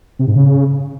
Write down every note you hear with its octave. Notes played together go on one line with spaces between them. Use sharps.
C3
G#2
C#3